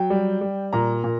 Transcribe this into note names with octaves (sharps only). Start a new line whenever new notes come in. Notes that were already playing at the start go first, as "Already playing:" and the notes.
Already playing: F#3 G5
G3
G3
A#2 A#5
A#2